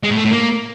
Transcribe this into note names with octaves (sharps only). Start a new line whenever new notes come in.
G#3
A2
A3
A2
A#3